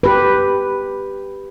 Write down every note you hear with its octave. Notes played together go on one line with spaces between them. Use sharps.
G4 B4